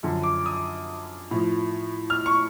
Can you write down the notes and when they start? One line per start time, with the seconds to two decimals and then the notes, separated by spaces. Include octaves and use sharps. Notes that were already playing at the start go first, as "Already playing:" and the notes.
0.03 F#2 D3 F3
0.23 D6
0.46 D#6
1.31 A2 F3
2.10 F6
2.26 C#6